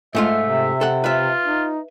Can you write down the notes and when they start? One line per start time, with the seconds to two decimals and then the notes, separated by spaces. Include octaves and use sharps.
0.15 G#2 A3 F4 E5
0.43 C3
0.81 A4 F#5
1.04 F4 B4 E5
1.46 D#4